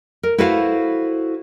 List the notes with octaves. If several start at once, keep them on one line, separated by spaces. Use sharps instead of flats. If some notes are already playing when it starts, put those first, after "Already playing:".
A#4
E4 F#4 A4 B4 C5 F5